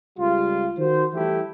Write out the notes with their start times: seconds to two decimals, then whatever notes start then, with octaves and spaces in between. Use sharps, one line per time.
0.19 C#2 G3 F4
0.78 D#3 F#4 C5
1.14 E3 G3 A3 E4 G4